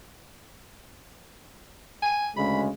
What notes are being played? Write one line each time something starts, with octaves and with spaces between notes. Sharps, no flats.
G#5
D2 C#3 G#3 B5